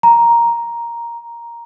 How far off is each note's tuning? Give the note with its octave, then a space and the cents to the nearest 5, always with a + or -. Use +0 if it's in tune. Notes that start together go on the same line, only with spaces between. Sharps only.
A#5 +5